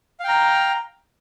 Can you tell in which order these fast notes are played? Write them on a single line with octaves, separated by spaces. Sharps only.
F5 G5 A#5